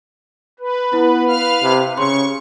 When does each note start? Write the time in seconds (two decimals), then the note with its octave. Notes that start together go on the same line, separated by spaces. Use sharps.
0.59 B4
0.93 B3 E4
1.27 B4 F5 F6
1.62 C3
1.98 C#3 C6 C#6